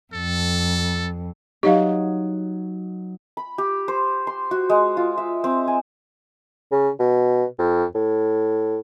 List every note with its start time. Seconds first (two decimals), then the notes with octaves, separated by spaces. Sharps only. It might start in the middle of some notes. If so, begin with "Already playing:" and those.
0.13 F2 A4
1.63 F#3 D#4 G4 D#5 F5
3.37 B5
3.58 G4
3.88 C5
4.27 C6
4.51 F#4
4.70 G#3
4.97 F4
5.18 E5
5.44 C4
5.68 G#5
6.72 C#3
6.99 B2
7.59 F2
7.95 A2